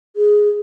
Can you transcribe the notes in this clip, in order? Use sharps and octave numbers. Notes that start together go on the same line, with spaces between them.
G#4